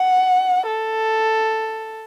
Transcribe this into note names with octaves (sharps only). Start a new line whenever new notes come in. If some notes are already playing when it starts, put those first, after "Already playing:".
Already playing: F#5
A4